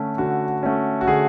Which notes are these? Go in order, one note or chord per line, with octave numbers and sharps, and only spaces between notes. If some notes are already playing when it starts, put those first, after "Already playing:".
Already playing: D3 A3 C#4
D3 F#4
A3 C#4
F#4
D3 G#4